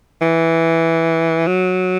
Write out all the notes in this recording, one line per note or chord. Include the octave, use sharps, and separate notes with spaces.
E3
F#3